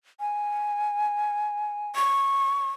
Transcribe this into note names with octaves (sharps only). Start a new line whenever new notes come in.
G#5
C#6